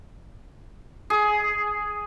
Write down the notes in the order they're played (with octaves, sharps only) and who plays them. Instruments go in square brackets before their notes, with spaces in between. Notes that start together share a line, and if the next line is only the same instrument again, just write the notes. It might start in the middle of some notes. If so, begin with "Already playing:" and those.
[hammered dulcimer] G#4